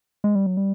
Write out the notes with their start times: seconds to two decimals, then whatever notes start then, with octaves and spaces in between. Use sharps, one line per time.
0.24 G#3
0.35 G3
0.46 F#3
0.57 G3